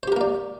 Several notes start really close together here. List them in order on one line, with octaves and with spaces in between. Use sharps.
C5 G4 A#4 A#3 D5